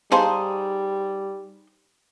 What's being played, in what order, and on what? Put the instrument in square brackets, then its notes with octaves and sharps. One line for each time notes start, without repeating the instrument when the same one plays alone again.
[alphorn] G3 [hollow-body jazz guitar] D#4 G#4 C5 [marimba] F5 A5 C6